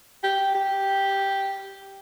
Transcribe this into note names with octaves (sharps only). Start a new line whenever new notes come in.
G4
G4